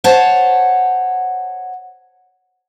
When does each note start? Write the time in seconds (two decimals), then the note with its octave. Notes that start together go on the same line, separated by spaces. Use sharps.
0.04 C5 C#5 F#5 A5